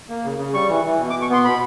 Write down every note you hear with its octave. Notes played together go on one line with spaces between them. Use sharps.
A#3
C#3
C#3
G3 C#6
E3
E3
B2
D6
B2
C#6
B3 C6
B2 B5